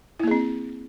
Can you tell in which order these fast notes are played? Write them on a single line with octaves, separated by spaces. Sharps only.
E4 A#3 G#4 C4